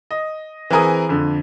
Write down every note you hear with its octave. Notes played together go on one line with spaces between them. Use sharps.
D#5
E3 C4 G#4 A#4 G#5 D#6
F2 D3